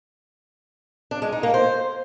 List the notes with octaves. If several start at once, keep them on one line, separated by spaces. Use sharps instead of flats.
D4
G#3
D#4
A#3
C5